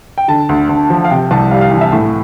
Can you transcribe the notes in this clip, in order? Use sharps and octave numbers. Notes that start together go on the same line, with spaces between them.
G5
D3 A5
D2
D2
F3
F5
C3 G5
C2 A5
G3 F5
F5
E3
E5
A2